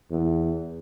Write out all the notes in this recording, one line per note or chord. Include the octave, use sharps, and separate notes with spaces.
E2